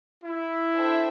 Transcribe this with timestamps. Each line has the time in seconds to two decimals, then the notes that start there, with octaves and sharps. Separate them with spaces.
0.24 E4
0.76 D4 A4 C5 E5 G5